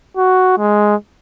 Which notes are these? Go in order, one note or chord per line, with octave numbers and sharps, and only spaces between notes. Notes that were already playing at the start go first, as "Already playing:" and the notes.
F#4
G#3